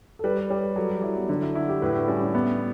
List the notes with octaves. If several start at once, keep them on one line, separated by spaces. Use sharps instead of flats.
A4
G3 B4
B4
G3 C#5
B4
F#3 A4
G4
F#3 E4
B3
D3 D4
E4
E4 F#4
G4
A2 B4
D4
G3 C#4
D4
B3 E4